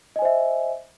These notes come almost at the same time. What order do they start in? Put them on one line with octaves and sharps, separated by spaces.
D#5 G#5 C5 E5